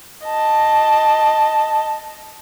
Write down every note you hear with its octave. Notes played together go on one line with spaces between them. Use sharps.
D#5 A5